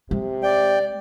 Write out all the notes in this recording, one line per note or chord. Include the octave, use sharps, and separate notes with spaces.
C3 G#3
D5 G5